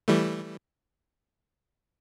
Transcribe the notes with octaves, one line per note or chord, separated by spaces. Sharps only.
E3 G3 A3